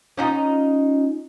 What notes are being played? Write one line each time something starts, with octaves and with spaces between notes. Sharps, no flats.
C#4 D#4 F4